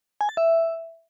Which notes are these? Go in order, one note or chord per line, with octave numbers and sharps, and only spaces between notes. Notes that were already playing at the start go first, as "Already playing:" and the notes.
G#5
A6
E5